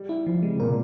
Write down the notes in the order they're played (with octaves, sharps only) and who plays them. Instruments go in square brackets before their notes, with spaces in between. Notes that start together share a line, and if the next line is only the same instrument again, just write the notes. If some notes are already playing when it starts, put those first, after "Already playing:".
Already playing: [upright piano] G3
[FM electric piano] E4
F3
[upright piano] C3 [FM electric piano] G#3
[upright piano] A#2 [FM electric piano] A#4